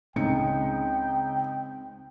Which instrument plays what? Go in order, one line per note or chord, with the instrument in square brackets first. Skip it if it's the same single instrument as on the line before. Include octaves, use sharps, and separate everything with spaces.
[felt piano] C#2 D#4 C#7 [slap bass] G#3 C4 [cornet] G5